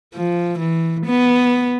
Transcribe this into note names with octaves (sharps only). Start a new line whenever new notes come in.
F3
E3
B3